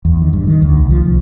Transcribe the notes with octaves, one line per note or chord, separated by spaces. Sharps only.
E2
D#3
G2
D#3
D2
C2
F3
C2